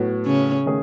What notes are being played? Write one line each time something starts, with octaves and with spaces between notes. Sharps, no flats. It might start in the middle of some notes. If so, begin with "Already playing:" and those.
Already playing: A2 F#3 B3 F#4
C#3 C#4
D#3 A3 C#4 G#4